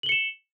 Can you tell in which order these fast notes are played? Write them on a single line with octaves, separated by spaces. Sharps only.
F#7 G7 C#7 E7